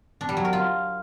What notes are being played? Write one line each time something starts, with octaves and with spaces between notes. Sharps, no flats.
D4
G3
F#3
A#4
F4